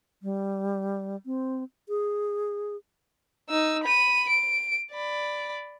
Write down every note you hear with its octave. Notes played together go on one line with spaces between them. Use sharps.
G3
C4
G#4
D#4 E6
B5 D#7
D7
D5 B5